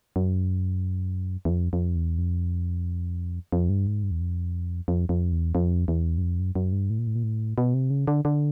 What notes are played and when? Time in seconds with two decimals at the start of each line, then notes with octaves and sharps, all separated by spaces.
0.16 F#2
1.45 E2
1.50 F2
1.73 F2
1.95 E2
2.18 F2
3.52 F2
3.69 G2
3.87 G#2
4.03 G2
4.11 E2
4.21 F2
4.88 F2
5.09 F2
5.32 E2
5.55 F2
5.88 E2
6.18 F#2
6.22 F2
6.40 F#2
6.55 F#2
6.72 G2
6.90 A2
6.99 A#2
7.07 A2
7.15 A#2
7.23 A2
7.58 B2
7.74 C3
7.90 C#3
8.07 D3
8.25 D3